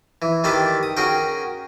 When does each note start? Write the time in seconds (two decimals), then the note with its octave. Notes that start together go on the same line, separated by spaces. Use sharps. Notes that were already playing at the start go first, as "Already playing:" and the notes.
0.22 E3
0.44 D#3 G3 D4 G4 A4 B4
0.83 D#6
0.97 C#4 F#4 G#4 A#4 G5